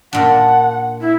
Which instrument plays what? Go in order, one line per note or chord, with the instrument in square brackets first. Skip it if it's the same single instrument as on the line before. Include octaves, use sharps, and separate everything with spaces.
[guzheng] A#2 D4 [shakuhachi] F#5
[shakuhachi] E4